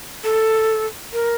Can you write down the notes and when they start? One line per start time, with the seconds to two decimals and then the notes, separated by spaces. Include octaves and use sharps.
0.24 A4
1.13 A#4